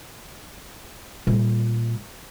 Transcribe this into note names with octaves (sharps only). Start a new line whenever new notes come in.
A#2 G3